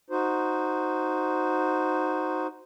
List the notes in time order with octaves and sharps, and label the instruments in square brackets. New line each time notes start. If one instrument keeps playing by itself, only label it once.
[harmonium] D#4 F#4 C5